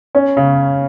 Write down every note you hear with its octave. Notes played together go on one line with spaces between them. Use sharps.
C#4
C#3